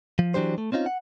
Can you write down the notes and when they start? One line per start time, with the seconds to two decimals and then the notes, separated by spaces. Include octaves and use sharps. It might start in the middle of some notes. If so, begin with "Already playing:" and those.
0.19 F3
0.34 E3 F#3 D4 G4 C5
0.58 A3
0.72 C4 C#4 D#4 F4
0.86 F#5